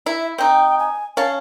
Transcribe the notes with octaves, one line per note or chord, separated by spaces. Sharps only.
E4 E5
C4 D#4 G5
G#5
C#4 F5 A5